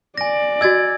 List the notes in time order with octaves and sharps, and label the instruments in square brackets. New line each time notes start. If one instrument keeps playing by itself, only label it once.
[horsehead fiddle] D5 [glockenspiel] G#5 A#6
[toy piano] F#4 D#5 [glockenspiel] E6 G#6 A6